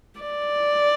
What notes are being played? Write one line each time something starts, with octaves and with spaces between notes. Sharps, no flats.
D5